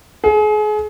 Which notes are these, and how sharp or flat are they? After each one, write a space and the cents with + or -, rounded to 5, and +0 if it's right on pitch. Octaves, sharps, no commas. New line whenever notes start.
G#4 +35